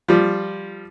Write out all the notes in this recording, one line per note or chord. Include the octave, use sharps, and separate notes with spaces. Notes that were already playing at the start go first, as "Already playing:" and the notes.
F3 G3